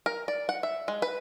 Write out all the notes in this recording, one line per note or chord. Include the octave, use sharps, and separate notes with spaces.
A#4
D5
F#5
E5
G#3
B4